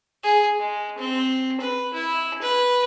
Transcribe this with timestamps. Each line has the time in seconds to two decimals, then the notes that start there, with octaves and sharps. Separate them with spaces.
0.23 G#4
0.59 G#3
0.98 C4
1.60 B4
1.93 E4
2.42 B4